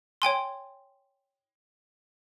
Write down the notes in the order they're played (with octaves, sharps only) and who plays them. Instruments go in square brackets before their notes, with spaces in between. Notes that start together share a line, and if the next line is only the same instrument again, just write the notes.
[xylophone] C#5 G5 G#5 C6